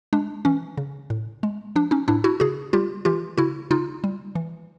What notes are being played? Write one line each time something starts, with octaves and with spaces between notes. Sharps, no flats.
G#3 D4
E3 C#4
C#3
A2
G#3
F3 D4
C#4 D#4
A2 D4 E4
E4 F#4
C#3 F#4 G#4
G3 F4 G4
E3 F4 G4
C#3 E4 F#4
C#3 D#4 F4
G3
E3